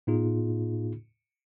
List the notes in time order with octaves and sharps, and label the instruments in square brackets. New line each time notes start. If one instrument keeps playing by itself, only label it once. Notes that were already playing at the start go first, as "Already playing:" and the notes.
[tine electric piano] A2 B3 D#4 F4 G#4